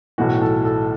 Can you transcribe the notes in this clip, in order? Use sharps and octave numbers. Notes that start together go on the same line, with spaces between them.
B1 A2 E3 F#4
A4
A4